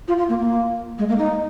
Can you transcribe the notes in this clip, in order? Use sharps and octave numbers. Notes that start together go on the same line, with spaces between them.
F4
F4
A#3
A#3
G#3
A#3
D#4